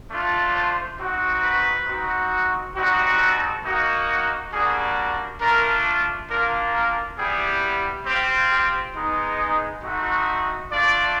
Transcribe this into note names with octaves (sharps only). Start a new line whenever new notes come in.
A3 D4 F4
C5
C4 D#4 F#4
B4
C4 D#4 F#4
G3 C4 D#4 F#4
A4
A#3 D#4 F#4
G3 A#3 D4 F#4 G#4
A3 D4 F4 A#4
A#3 D4 F4 A#4
A#4
G3 B3 E4 G4 G#4
C4 F4 G4
G4
G#3 B3 D#4
G#4
A3 C4 D#4 F#4
A3 D4 F4 D5